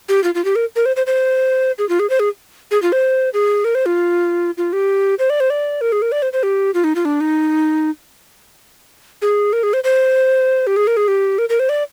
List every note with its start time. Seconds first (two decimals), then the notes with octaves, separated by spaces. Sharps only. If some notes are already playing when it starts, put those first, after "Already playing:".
0.09 G4
0.24 F4
0.35 F4
0.45 G4
0.56 A#4
0.76 A#4
0.86 C5
0.96 C5
1.07 C5
1.78 G#4
1.89 F4
1.99 G#4
2.10 C5
2.20 G#4
2.71 G#4
2.82 F4
2.92 C5
3.34 G#4
3.64 A#4
3.75 C5
3.86 F4
4.57 F4
4.73 G4
5.19 C5
5.30 D5
5.40 C5
5.50 D5
5.81 A#4
5.92 G#4
6.02 A#4
6.12 D5
6.22 C5
6.33 C5
6.43 G4
6.74 F4
6.84 D#4
6.95 F4
7.05 D4
7.21 D#4
9.22 G#4
9.53 A#4
9.63 G#4
9.73 C5
9.84 C5
10.67 G4
10.76 G#4
10.87 A#4
10.97 G#4
11.08 G4
11.38 A#4
11.49 A#4
11.59 C5
11.69 D5